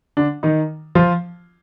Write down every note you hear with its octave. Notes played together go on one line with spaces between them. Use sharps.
D3 D4
D#3 D#4
F3 F4